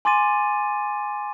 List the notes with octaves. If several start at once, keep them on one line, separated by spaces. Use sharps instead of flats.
G#5 C6 D6 A6 D#7